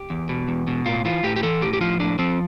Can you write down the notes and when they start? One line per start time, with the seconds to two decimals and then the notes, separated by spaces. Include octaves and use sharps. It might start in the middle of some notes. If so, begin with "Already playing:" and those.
Already playing: G4
0.10 E2
0.29 B2
0.48 E2
0.67 B2
0.86 A2 F4
1.05 E3 F4
1.23 A2 G4
1.36 G4
1.43 E3 A4
1.61 A2 G4
1.73 G4
1.81 F3 F4
2.00 A2 D4
2.19 F3 C4